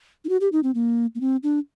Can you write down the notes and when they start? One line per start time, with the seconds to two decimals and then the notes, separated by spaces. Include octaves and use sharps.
0.25 D#4
0.29 F#4
0.41 G4
0.52 D#4
0.63 C4
0.75 A#3
1.15 A#3
1.21 C4
1.43 D4